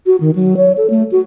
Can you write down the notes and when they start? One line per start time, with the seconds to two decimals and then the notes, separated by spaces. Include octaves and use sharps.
0.06 F#4
0.20 D#3
0.35 F#3
0.57 C#5
0.77 A4
0.90 A3
1.12 F#4